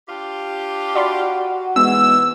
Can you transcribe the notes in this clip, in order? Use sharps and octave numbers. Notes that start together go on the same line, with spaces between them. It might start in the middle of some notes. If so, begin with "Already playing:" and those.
D4 F4 G4
F#4 D5 B5 C6
G#2 E3 G#3 B3 E6